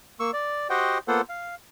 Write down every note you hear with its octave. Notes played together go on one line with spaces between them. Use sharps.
A#3 C#6 E6
D5
F#4 G4 C5 D#5 F#5 G5
A#3 B3 F4 A4 C5 F#5
F5